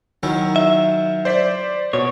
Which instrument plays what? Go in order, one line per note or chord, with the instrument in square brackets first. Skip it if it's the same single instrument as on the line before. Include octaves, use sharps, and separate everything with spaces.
[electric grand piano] D#3 [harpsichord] F#3 C#4 E4
[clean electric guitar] E5
[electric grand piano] C5 D5 B6
[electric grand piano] B2 [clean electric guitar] C#5